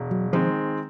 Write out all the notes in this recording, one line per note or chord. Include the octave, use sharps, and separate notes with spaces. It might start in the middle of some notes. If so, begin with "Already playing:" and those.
Already playing: E1
F#3
D#3 F3 G#3 C4